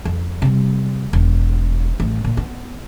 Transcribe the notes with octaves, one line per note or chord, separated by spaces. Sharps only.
F2
C3 G3
E1
A1
A#2
B3